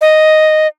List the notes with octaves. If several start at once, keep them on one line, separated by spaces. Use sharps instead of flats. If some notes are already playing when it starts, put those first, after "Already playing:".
D#5